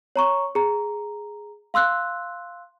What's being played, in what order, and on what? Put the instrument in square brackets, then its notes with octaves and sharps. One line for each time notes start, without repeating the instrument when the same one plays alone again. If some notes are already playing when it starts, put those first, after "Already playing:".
[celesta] C#5 A#5 C#6
G#4 A#5
F5 C6 E6 F#6